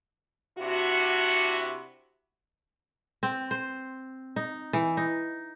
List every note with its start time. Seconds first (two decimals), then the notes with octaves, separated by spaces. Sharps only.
0.58 C3 D4 E4 F#4
3.23 C4
3.51 C5
4.36 D#4
4.73 E3
4.97 D#4